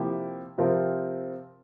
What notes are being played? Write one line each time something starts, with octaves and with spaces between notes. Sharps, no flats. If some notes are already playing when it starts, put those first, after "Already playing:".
Already playing: C3 F3 A#3 E4 G4
C3 F3 C4 F4 A#4